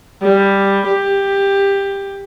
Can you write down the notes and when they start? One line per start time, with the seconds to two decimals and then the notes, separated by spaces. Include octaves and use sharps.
0.22 G3
0.88 G4